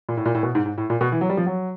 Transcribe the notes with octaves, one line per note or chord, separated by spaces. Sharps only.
A#2
A2
A#2
A2
B2
G#2
G#2
A2
A#2
B2
E3
F#3
G3
F3
F#3